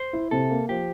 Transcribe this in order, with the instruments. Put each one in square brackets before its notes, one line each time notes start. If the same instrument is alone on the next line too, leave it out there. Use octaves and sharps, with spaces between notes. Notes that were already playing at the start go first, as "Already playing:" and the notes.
Already playing: [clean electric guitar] C5
[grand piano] E4
[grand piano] C3 [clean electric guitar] A4
[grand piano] A#3
[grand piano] F3 [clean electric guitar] G4